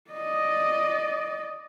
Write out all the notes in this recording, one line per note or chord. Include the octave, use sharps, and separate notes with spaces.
D5 D#5